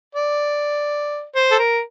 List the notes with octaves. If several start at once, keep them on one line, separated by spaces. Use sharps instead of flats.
D5
C5
A4
A#4